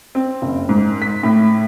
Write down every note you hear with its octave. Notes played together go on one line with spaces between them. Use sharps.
C4
F#1
G#2
B6
A2